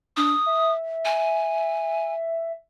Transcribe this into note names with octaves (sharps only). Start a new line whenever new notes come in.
D4 D#6
E5
G#5